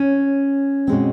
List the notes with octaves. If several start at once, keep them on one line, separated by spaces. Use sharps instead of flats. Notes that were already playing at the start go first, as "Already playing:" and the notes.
Already playing: C#4
B2 G#3 C4